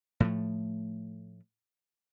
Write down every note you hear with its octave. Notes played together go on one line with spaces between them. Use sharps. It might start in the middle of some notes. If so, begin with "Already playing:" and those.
A2 F3 A3